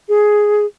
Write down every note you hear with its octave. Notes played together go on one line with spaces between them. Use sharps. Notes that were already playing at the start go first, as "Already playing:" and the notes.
G#4